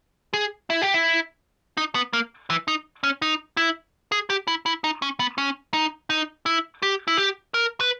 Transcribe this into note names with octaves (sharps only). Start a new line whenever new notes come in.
G#4
E4
G4
E4
D#4
B3
A#3
E3
D#4
C#4
D#4
E4
G#4
G4
E4
E4
D#4
C#4
B3
C#4
D#4
D#4
E4
G4
E4
G4
A#4
B4